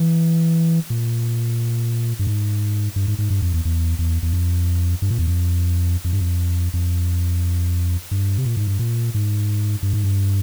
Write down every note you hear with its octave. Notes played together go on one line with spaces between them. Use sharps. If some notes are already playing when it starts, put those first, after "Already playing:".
Already playing: E3
A#2
G2
G#2
G2
G#2
G#2
G2
F2
E2
E2
E2
E2
F2
G2
A#2
E2
F2
F2
G2
F2
F2
G2
C3
A#2
G#2
G2
A#2
G#2
G2
G#2
G2